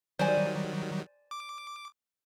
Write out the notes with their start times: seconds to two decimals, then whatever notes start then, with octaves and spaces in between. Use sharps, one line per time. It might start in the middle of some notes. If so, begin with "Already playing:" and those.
0.19 D#3 F#3 G3 C5 D5 G#5
1.31 D6